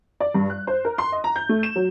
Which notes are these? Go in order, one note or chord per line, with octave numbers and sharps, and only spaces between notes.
D5
G2
F#6
C5
A#4
C6
D#5
A#5
G6
A3
E7
F#3